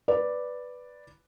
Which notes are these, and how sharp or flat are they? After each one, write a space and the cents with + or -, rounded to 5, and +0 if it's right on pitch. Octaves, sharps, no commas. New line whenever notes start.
B4 +0 D5 +0